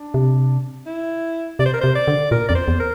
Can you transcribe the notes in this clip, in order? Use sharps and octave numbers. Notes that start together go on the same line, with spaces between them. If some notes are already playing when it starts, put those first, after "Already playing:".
Already playing: D4
C3
E4
C3 D5
C5
A#4
C3 C5
D5
D3
A#2 A#4
F2 D5
C5
E2
A#4